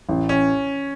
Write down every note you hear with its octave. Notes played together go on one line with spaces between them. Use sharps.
A1
C#4